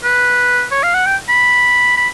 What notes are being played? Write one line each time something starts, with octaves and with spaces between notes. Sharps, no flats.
B4
C#5
F5
F#5
G5
B5
B5